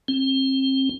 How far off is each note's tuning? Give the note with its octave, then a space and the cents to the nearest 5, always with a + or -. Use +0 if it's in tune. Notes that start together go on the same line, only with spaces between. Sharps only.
C4 +30